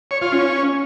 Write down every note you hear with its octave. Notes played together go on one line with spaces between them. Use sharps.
C#5
F4
C#4